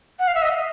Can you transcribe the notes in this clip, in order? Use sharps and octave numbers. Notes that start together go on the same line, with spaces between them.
F#5
F5
E5
D#5